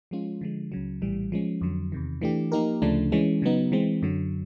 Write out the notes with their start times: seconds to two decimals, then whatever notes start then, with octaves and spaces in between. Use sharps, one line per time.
0.11 F3 G#3 C#4 F4
0.41 D3 F3 G#3
0.72 C#2 C#3 F#3
1.02 A#1 A2 E3 G3
1.32 F3 G#3 C#4
1.61 F2 D3 F#3
1.92 E2 C3 D#3
2.22 E3 A3 D4 G4
2.52 F3 A#3 D#4 G4 A#4
2.82 D2 C#3 F3 A3 D4
3.12 E3 G#3 C#4
3.42 C#3 F#3 B3 D#4
3.72 E3 G#3 C4
4.02 F#2 D3 F#3